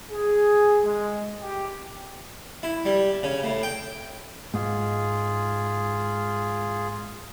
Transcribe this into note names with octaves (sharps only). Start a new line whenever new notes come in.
G#4
G#3
G4
E4
G3
C#3
A2
G5
G#2 F4 G#4